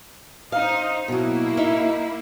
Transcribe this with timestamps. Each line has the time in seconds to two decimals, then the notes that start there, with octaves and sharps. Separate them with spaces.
0.52 D#4 C5 F5
1.08 B2 F#3 A#3 E4
1.57 D#4 E5